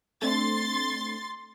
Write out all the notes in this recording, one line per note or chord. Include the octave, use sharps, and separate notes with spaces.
A3 C4 D4 C6 A6